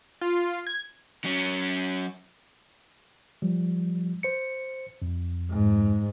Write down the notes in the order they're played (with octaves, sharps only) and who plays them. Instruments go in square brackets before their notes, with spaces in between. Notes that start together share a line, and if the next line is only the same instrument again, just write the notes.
[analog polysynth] F4
G#6
[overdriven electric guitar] F#3 C#4
[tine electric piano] F3 G3
C5 C#7
F2
[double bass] G#2